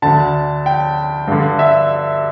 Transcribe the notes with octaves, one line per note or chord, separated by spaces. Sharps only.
D2 D3 A5
G5
G2 D3
E5